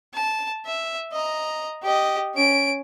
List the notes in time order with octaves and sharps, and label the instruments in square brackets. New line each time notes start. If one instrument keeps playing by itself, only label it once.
[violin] A5
E5
D#5 A#5
G4 D#5
C#4 D7